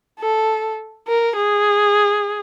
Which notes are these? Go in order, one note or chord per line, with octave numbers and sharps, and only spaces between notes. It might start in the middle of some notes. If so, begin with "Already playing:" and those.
A4
A#4
G#4